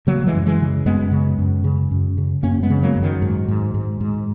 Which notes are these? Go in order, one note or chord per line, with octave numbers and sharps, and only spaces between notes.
C#3 F#3 A#3
E3 G#3
F#2
E3 G#3
C#3
F#2 G#3 B3
C#3
F#2
C#3
F#2
C#3
F#2 A#3 C#4
G#3 B3
C#3
F#3 A#3
F#2
D#3 F#3
G#2
G#2
G#2
G#2